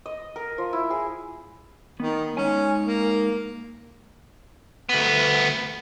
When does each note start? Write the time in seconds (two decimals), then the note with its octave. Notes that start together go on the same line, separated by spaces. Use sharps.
0.06 D#5
0.36 A#4
0.58 F3
0.73 E4
0.90 G#4
2.00 D#3 B3
2.37 G#3 C#4 D#4 G#5
2.86 A#3
4.89 D2 B3